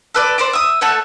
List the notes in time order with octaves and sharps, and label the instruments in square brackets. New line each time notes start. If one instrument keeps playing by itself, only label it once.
[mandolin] A4 B4 D5
C5 D5 D6
E5 D#6
A3 A4 C#5 F#5